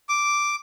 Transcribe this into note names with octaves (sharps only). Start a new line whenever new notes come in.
D6